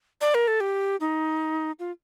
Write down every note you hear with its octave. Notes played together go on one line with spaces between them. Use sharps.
D5
A#4
A4
G4
D#4
F4